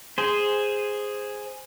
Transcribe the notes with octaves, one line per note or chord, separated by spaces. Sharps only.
G#4 C5